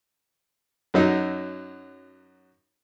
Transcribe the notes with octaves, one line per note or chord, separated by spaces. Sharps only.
F#2 F#3 D#4